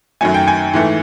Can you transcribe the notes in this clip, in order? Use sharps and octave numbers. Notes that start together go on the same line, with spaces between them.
F#2 D#3 F#3 A3 G#5
G5
G#5
G#2 E3 A3